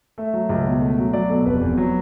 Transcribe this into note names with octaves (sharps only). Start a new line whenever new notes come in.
A3 E5
F#3
C#2
B2
A3
F#3
F#3 D5
B2 A4
F1 B4
E2
F#3